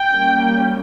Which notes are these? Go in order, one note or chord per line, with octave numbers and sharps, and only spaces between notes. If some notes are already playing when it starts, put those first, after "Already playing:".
Already playing: G5
G3 A#3 C#4